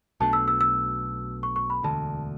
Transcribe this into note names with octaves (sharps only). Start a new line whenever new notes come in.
B1 B2 A3 D4 A5
E6
E6
E6
C#6
C#6
B5
E1 D2 D3 A5